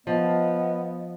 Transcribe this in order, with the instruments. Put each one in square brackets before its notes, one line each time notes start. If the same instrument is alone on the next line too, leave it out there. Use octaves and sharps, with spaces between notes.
[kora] F3 [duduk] B3 [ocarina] D#5